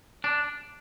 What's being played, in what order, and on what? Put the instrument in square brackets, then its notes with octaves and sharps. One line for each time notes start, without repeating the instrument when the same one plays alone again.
[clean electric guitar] D4